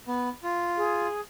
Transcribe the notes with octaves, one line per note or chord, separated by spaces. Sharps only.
B3
F4
G#4